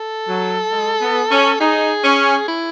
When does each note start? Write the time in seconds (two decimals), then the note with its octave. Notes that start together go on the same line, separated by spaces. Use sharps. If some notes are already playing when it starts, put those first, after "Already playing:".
Already playing: A4
0.28 F#3
0.72 G#3
1.01 B3
1.31 C#4
1.60 D#4 G#4
2.04 C#4
2.48 E4